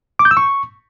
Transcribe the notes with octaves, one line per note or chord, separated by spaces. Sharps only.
D6
G6
E6
C#6